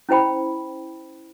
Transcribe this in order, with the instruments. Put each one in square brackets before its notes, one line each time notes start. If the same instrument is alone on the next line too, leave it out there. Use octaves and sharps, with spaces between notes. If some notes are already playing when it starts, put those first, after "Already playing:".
[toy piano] C#4 E4 C5 G5 B5